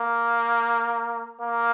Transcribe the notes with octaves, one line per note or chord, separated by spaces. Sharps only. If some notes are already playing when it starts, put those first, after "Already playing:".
Already playing: A#3
A#3